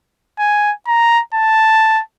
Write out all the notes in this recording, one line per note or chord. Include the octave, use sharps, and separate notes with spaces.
G#5
A#5
A5